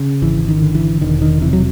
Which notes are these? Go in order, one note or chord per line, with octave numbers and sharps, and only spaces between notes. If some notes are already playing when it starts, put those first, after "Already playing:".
Already playing: C#3
G#1 E3
D#3
D3
E3
E1 D#3
D#3
C3 E3
F#3